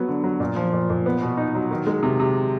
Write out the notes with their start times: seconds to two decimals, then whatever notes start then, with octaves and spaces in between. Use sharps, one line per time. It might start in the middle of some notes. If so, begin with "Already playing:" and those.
Already playing: F#3 B3
0.08 D3
0.24 F#3
0.40 A#2
0.56 F3
0.73 A#2
0.90 A#2
1.06 B3
1.22 B2
1.37 D#4
1.55 F#3
1.71 D#3
1.87 G#3
2.03 C3
2.20 C3